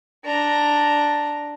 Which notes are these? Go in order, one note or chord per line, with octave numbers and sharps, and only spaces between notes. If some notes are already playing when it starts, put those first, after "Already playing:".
D4 A#5